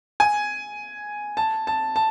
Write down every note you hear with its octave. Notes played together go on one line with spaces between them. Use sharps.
G#5
A5
A5
A5